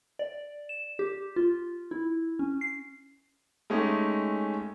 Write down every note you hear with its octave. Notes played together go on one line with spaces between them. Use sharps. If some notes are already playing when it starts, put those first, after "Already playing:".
D5
E7
G4
F4
E4
C#4
C7
G#3 A3 C#4 D#4 G4